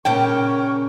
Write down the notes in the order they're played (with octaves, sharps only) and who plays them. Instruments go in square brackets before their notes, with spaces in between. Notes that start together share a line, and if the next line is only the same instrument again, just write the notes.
[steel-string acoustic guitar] A#2 C#3 C#4 [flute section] A#4 C#6 [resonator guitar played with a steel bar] G5